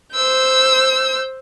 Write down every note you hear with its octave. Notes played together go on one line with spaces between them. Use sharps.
C5 E6 G6